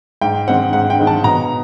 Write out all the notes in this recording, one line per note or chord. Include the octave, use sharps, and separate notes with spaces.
G#2 G5
D#3 G#3 C4 F#5
G#2 F#5
G5
D#3 G#3 C4
A5
B2 A#5